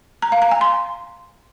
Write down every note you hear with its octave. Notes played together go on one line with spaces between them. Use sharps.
A#5
F5
A#5
G#5
C6